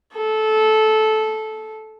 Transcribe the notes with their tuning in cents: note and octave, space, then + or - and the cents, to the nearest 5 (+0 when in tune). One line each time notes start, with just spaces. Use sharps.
A4 -15